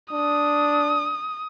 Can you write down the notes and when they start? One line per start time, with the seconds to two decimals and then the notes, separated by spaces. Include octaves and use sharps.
0.12 D4 D#6